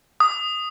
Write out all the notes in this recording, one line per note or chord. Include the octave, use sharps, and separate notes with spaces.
D#6